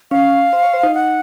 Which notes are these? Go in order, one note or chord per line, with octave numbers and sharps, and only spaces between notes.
C#4 F5
C5
C#5
C5
D#4
F#5